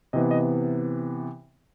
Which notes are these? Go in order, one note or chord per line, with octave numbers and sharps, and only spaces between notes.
C3 E3 B3 D#5
D#5